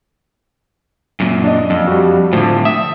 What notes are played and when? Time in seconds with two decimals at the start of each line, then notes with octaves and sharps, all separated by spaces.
1.20 F#2 A#2
1.44 D4 D#5
1.70 F2
1.88 G3 F#4
2.33 A2 D3 F3
2.65 E5 D#6